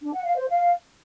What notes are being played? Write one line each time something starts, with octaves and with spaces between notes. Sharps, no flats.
D4
F#5
F5
C5
F5